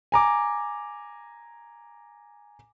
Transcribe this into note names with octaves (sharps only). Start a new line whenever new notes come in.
G#5 A#5 D6